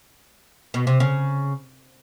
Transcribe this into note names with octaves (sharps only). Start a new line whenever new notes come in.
B2
C3
C#3